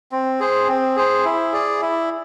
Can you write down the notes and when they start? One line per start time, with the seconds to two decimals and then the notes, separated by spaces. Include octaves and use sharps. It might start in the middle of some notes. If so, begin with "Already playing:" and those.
0.12 C4
0.40 G#4 C5
0.68 C4
0.96 G#4 C5
1.25 E4
1.52 G#4 D5
1.81 E4